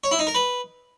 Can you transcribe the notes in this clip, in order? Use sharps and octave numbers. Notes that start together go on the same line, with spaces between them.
C#5
E4
D#4
A#4
B4